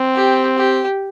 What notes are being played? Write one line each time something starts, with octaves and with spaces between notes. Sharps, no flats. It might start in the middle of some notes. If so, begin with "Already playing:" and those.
Already playing: C4
G4
G4